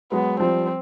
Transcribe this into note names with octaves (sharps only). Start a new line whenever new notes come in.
F#3 G#3 B3
F3 G3 C4